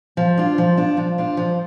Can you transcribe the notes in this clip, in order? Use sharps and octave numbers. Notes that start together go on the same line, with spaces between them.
F3
D4 F4
F3
D4 F4
F3
D4 F4
F3